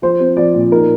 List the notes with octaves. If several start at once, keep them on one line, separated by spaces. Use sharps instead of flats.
F3 C5
C4
F3 D5
A#2
D#4 A#4